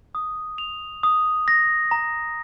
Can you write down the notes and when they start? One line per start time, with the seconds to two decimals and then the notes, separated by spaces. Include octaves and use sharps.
0.15 D#6
0.58 F7
1.03 D#6
1.48 A#6
1.91 A#5